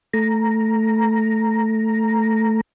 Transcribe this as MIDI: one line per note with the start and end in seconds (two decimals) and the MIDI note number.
0.14 2.61 57
0.14 2.61 82